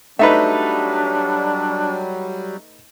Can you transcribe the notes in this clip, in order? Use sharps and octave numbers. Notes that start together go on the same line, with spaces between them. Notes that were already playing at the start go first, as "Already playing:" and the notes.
F#3 G3 A3 D4 D#4 B4 E5